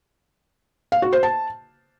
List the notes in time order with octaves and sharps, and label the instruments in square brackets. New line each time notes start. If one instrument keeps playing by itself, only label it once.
[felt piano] F5
F#4
C5
A5